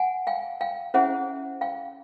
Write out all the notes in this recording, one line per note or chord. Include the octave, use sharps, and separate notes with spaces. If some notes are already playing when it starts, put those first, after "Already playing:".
Already playing: F#5 G#5
F5 G5
F5 G5
C#4 E4 G#4 C5 E5 F#5
F5 G5